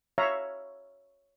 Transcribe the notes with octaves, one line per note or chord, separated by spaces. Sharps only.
C#5 E5 F5 A#5